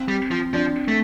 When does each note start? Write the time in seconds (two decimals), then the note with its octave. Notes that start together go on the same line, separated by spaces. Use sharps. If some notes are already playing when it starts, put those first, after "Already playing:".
Already playing: C4
0.08 G3
0.31 F3
0.53 F3 D4
0.88 A3